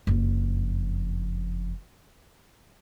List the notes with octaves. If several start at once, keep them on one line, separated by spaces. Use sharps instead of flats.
F#1 F2